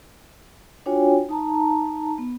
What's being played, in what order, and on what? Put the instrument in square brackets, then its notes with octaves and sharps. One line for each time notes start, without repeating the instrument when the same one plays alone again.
[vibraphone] D4 F4 F#4 C#5 G5 G#5
D#4 A5 A#5
B3